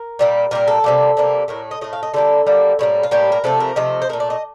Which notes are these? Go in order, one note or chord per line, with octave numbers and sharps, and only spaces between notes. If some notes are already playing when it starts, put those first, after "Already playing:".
Already playing: A#4
A#2 G3 A#3
A#2 G3 A#3 A#4
A4
C3 G3 A#3
C3 G3 A#3
A2 A3 A#4
D#5
A2 A3 D#5
F5
D#5
D3 G3 A#3 A4
D3 G3 A#3
A2 G3 A#3
F4
A2 G3 A#3 G4
A#4
C3 F3 A3 A4
A#4
C3 F3 A3 D#5
C5
A#2 A3 A#4
D5
D#5